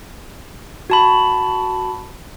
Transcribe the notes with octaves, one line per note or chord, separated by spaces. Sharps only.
F#4 A5 B5